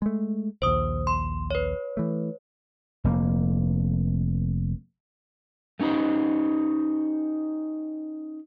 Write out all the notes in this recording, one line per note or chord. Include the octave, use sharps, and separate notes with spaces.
G#3 A3
A#1 D#2 C5 D#6
C6
B4 C#5
E3 A3
F1 A#3
A3 C#4 D#4 G4 C5